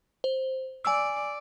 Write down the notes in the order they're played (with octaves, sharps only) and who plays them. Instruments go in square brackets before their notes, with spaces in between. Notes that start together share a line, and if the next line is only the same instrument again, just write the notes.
[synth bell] C5
[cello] D5 [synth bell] G#5 E6